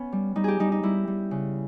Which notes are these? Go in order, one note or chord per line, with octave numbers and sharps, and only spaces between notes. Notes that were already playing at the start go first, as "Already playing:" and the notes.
Already playing: B3 C#4
G3
G3 D#4
G4 G#4
G3 D#4
D#4
G3 E4
G3
C#3